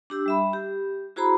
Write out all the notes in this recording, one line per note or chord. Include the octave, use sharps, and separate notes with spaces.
D4 G4 E6
G3 E5 B5
G4
E4 F#4 G#4 C5 A#5 B5